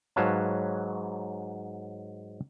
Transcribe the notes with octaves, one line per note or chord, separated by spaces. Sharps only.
G#2 F#3 B4 C#5 F5 A5